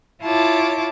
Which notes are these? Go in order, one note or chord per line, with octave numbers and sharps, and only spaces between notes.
E4 F4 C#5 A5 D6